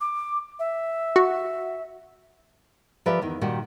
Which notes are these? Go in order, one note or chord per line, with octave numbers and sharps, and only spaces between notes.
D6
E5
F#4
F3 G4 A#4 B4 D5 E5
E2 D#3
A#2 D#3 G3 F#4 G4